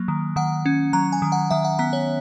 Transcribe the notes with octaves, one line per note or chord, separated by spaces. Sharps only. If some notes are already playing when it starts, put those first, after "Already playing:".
Already playing: F#3 A#3
D#3
D#3 F#5
C#4
F#3 A#5
G#5
D#3
F#5
D#3 E5
F#5
B3 A#5
C#5